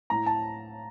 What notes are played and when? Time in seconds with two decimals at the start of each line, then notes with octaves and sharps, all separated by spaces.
0.10 A2 A#5
0.26 A5